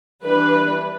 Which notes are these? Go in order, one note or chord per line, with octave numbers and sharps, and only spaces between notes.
E3 G3 D4 B4